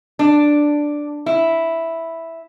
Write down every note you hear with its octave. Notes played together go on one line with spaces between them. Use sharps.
D4
E4